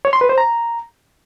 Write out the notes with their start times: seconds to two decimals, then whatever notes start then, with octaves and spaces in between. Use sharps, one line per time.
0.05 C#5
0.13 C6
0.21 B4
0.29 C5
0.38 A#5